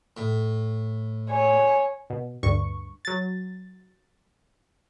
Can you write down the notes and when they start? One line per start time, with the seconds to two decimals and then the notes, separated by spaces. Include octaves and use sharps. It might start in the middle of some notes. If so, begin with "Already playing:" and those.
0.17 A2
1.30 C#5 G#5
2.10 B2
2.43 D2 G2 C#6
3.05 F#3 A6